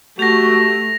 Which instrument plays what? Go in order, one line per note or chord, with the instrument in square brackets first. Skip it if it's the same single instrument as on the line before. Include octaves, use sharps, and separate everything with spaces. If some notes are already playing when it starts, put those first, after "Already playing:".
[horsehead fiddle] A3 [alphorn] F#4 [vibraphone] G4 A4 A5 [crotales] A#6 F7